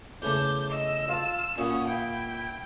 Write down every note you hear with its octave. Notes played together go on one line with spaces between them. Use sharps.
E2 C#3 A3 D6 G6
D#5 E6
F4 F5 A5
A#2 C#4 F5 F#5 B5 D#6
E4 F5 G5